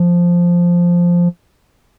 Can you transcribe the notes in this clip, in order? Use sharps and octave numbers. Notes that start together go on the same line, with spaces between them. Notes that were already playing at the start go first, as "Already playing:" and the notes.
Already playing: F3